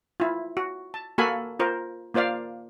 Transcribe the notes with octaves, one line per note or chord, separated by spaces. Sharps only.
E4 F4
F#4
A5
A#3 F#4 A4 F5 G#5 B5
F4 A#4 C5
A#3 F4 C5 D5 F5